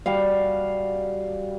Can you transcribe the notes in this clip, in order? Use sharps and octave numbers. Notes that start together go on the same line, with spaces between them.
G3 F#4 F5